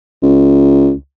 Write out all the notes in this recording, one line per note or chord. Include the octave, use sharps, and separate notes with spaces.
C#2